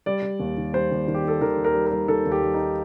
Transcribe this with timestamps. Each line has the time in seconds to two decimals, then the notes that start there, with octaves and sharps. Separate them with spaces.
0.06 G3 D5
0.22 G3
0.39 D#2
0.57 D#3
0.73 G3 C5
0.91 D#2
1.08 D#3
1.15 G4
1.24 D#3 A4
1.41 D#3 A#4
1.58 D#2
1.64 A#4
1.75 G3
1.86 A#4
1.91 G3
2.08 D#3 A4
2.26 D#2
2.32 G4
2.43 G3
2.54 D#4